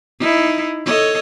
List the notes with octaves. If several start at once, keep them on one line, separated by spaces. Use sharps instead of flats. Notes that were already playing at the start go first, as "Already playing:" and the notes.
D#4 E4
A4 C#5 D#5